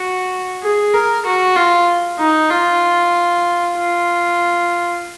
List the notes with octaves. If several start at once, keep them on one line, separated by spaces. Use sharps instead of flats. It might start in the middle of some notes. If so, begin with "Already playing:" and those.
Already playing: F#4
G#4
A#4
F#4
F4
D#4
F4
F4